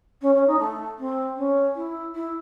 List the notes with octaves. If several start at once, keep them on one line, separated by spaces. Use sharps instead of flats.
C#4
C#4
D#4
A3
C4
C#4
E4
E4